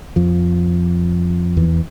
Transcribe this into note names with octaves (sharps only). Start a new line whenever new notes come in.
F2 F3
E2 E3